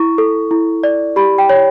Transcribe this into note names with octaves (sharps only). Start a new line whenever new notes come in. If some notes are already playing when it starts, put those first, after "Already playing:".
Already playing: E4 C#6
A4
E4
D5
G4 B5
G5
C#5